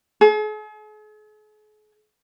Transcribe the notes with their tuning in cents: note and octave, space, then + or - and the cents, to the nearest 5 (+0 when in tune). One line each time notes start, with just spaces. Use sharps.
G#4 +45